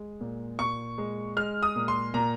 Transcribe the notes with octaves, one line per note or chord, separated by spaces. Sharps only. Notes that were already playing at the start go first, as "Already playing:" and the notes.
Already playing: G#3
A#2
A#2 C#6
G#3
G#3 F6
D#6
A#2
C6
A#2 A#5